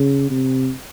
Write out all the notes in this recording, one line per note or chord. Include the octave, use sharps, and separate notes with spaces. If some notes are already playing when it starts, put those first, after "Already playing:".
Already playing: C#3
C3